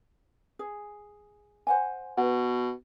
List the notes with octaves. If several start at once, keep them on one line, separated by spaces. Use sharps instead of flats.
G#4
C5 F#5 G#5
B2 B4 F#5